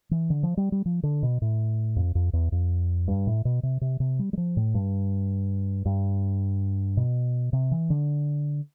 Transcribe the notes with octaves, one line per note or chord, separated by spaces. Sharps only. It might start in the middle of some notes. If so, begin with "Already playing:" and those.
E3
D3
F3
G3
G3
F3
D3
B2
A2
F2
F2
E2
F2
G2
A2
B2
C3
C3
C3
G3
G3
F3
A2
G2
G2
B2
C3
E3
D3